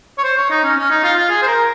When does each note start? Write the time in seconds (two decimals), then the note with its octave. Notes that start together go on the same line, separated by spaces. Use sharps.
0.18 C#5
0.24 C5
0.37 C#5
0.50 D#4
0.63 C#4
0.77 C#4
0.90 D#4
1.03 F4
1.17 F4
1.30 G#4
1.43 C5
1.47 A#4